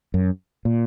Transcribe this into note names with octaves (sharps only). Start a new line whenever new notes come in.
F#2
A#2